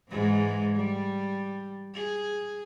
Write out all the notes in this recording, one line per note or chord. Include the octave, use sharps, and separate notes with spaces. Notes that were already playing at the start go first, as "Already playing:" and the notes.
G#2 E3 G#3
G3
G#4